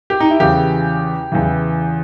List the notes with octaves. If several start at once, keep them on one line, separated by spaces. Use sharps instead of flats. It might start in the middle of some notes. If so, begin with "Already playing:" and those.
G4
D#4
E4
E2 C#3 E3 G4
E2 C#3 E3